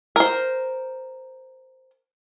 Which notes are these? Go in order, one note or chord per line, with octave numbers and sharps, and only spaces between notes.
A#4 C5